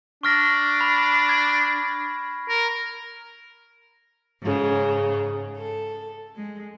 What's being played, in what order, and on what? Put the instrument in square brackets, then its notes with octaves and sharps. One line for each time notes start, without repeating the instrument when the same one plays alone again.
[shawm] D4 [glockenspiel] C#6 F6 A#6
[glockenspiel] B5
G#6
[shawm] A#4
[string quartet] G#2 C#3
A4
G#3